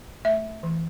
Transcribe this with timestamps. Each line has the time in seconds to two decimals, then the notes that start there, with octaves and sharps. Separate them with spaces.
0.25 A3 E5
0.63 E3